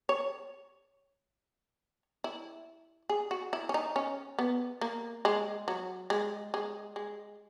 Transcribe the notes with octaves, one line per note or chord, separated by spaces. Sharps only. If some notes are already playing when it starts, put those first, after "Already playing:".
C#5
E4
G#4
F#4
E4
C#4
D#4
C#4
B3
A#3
G#3
F#3
G#3
G#3
G#3